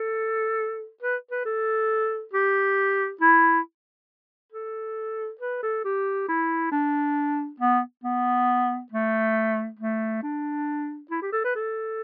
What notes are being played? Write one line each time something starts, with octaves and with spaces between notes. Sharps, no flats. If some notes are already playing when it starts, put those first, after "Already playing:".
Already playing: A4
B4
B4
A4
G4
E4
A4
B4
A4
G4
E4
D4
B3
B3
A3
A3
D4
E4
G4
A4
B4
A4